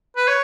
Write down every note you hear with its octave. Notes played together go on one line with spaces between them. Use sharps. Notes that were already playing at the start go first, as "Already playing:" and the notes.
B4
C#5